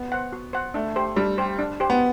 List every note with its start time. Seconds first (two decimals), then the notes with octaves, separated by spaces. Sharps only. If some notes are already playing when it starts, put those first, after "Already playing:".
Already playing: B3
0.12 C5 F#5
0.32 F#4
0.53 C5 F#5
0.74 A3 D4
0.96 G4 C5
1.16 G3 D4
1.38 G4 C5
1.59 D4
1.80 G4 C5
1.90 B3